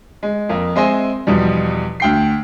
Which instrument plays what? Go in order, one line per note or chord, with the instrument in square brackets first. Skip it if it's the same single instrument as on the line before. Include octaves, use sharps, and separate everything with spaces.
[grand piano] G#3
F2 A#3
G#3 C4 C5 D#5 E5 G#5
E2 B2 F3 G3
D2 G5 C7